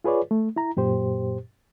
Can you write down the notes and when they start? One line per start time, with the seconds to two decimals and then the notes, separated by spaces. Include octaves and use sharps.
0.04 F4 G#4 B4 C#5 D5
0.31 A3
0.56 E4 A#5
0.77 F#2 A#2 G4 C5